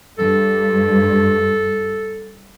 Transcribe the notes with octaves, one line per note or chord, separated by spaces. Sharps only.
G2 A4